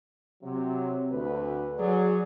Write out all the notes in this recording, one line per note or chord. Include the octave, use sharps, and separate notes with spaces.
C3 F#3
D2 B4
F#3 G#4 D5